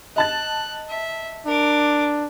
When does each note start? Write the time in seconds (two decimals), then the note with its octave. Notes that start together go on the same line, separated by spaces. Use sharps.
0.16 D#5 A5 F#6 A6
0.89 E5
1.46 D4 A#4 D6